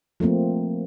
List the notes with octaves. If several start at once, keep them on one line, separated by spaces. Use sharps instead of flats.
F3 A3 A#3 C4